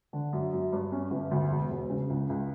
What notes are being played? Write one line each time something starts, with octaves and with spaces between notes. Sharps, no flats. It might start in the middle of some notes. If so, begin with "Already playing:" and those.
D3
F#2
F#2
G2
C#4
G1
D2
E1
E1
C#3
C#2
C#2